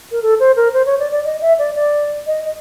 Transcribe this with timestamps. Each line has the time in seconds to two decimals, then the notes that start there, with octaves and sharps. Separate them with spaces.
0.12 A#4
0.22 A4
0.40 C5
0.57 A#4
0.73 C5
0.86 C#5
0.99 D5
1.12 D5
1.25 D#5
1.41 E5
1.59 D5
1.75 D5
2.27 D#5
2.45 D#5